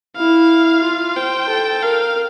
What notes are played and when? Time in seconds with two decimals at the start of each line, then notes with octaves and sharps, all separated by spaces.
0.16 E4 F5
0.83 F4
1.16 C5 G5
1.49 A4
1.83 A#4 F5